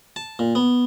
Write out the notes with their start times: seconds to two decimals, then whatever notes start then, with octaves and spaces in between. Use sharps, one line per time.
0.16 A5
0.39 A#2
0.55 B3